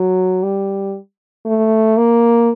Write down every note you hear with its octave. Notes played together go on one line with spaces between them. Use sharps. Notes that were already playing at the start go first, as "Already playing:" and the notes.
Already playing: F#3
G3
A3
A#3